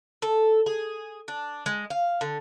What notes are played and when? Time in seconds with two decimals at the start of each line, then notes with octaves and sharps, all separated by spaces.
0.22 A4
0.66 G#4
1.28 D4
1.66 G#3
1.90 F5
2.21 D3